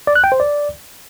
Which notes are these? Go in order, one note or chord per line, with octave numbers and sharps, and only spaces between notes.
D5
F#6
G5
C5
D5